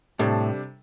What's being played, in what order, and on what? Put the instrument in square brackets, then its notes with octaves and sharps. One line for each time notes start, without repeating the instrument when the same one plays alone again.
[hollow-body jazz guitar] A2 [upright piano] C3 G3 D4 A4